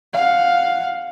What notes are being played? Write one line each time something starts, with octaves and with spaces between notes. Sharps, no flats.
F5 F#5